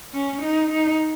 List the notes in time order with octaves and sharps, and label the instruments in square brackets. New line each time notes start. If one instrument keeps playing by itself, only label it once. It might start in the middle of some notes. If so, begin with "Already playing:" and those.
[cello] C#4
D#4
D#4